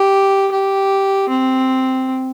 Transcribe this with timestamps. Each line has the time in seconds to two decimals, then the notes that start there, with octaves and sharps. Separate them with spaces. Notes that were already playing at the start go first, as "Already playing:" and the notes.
Already playing: G4
0.52 G4
1.29 C4